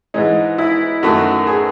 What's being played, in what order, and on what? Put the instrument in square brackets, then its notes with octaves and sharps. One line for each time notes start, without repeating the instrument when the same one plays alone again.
[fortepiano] G#2 E3 G#3 D#4
E4
F#2 D#3 A3 F#4
G#4